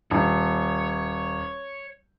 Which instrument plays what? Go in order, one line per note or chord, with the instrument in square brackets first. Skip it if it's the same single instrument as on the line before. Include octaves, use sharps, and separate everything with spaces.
[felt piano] D#1 [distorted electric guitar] C#5